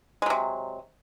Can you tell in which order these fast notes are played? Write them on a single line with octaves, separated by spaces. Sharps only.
G#3 F#3 C3